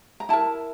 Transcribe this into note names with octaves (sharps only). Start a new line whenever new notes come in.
A#5
E4 A#4 A5